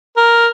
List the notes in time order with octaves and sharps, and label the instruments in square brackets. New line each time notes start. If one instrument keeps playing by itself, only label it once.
[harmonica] A#4